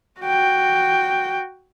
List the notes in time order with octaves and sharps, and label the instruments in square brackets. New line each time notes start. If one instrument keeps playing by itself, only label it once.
[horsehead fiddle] F#4 G5